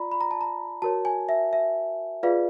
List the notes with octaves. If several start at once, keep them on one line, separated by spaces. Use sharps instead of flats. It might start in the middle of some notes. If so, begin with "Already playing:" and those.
Already playing: F4 D5 A#5 B5
B5
A#5
A5
A#5
F#4 A#4 C#5 A5
G#5
E5
E5
F4 G#4 B4 D5 F5